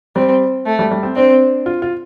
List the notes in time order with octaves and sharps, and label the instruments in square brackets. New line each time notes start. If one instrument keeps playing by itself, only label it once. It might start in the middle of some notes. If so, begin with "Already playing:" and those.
[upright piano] G3 [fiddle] C4
[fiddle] A3
[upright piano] G3
G3
C4
[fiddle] C4 [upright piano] D4
[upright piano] F4
F4